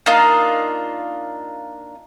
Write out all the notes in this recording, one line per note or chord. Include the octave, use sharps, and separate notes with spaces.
A#3 D4 D#4 F4